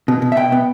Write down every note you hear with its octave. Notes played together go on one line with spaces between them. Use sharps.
B2
B2
E5
B2 G5
B3